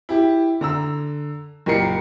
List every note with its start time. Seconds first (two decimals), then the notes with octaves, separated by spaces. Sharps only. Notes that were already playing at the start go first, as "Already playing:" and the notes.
0.09 E4 G4
0.61 D3 A#5 E6
1.66 F#1 A#2 G4 A#4 C7 C#7